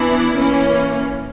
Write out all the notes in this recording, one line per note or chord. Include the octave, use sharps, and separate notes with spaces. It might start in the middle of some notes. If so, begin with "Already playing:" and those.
Already playing: E3 B3 D4 E4
E3 A#3 C#4